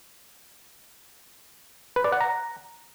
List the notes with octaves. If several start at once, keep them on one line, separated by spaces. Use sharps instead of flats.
B4
D5
F#5
A#5